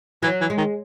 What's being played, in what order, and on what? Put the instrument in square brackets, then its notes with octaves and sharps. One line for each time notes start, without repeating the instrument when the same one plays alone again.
[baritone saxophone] E3 [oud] F#3
[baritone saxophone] E3
[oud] G#3
[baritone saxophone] D#3